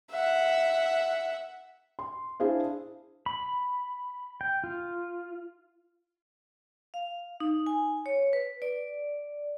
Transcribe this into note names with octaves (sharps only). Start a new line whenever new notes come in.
E5 F#5
C6
D4 E4 G#4 C5 F5
B5
G5
F4
F5
D#4
G#5
C#5
B4
D5